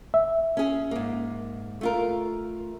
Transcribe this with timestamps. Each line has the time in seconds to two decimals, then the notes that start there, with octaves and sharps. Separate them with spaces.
0.14 E5
0.57 C#4 G#4
0.91 G#2 A#3
1.81 A3 F4 A#4